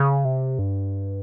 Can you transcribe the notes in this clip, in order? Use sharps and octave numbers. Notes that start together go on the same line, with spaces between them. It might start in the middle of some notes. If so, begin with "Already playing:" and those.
Already playing: C#3
C3
G2